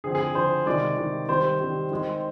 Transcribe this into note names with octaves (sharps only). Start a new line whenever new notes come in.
D3 F3 C4 G#4
G#4
D3 F3 C4 C5
C3 D#3 G#3 D5
C3 D#3 G#3
D#3 G3 C4 C5
D#3 G3 C4
D#3 G#3 C4